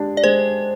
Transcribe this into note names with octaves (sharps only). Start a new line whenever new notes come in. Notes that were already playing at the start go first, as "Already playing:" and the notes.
Already playing: G#3 D4 G4
D5
G#3 C5